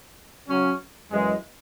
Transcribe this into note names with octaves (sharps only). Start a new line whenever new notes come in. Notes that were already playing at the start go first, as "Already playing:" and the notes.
C#3 F#3 C#4
F#2 E3 G#3